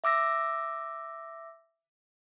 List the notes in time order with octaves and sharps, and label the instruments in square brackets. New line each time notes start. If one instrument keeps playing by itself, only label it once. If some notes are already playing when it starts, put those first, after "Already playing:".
[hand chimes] E5 D6 E6 A#6